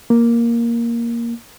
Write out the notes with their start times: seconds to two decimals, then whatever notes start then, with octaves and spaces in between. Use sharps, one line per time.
0.10 A#3